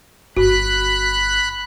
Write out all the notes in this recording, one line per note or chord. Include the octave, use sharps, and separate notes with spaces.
G1 F#4 B5 F#6